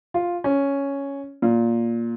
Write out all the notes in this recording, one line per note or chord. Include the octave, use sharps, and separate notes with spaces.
F4
C#4
A#2